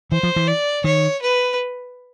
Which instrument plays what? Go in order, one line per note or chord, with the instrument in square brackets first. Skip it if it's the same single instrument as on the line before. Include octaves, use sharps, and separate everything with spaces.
[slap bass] E3 [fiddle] C5
[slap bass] F3
E3
[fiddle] D5
[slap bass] D#3 [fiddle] C#5
[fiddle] B4